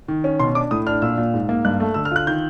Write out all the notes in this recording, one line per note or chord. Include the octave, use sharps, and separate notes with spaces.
D#3
C#4
B2 C6
D4 D6
A2 D#6
D4 F6
A#2 E6
A#2
G#2
A#3
G2 F#6
A3
D3 E6
F6
F4 F#6
D#3 G6